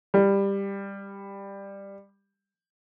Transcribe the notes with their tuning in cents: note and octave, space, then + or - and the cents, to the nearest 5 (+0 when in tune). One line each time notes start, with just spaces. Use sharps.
G3 +15